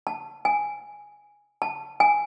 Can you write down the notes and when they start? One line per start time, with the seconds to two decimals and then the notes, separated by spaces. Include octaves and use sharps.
0.07 A5
0.45 G#5
1.62 A5
2.00 G#5